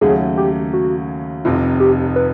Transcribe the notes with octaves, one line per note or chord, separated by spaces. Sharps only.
D#2 C#3 F#3 A3 C#4 G#4
G4
F#4
F1 F2 C3 F4
G4
B4